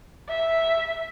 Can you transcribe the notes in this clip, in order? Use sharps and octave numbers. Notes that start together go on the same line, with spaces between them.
E5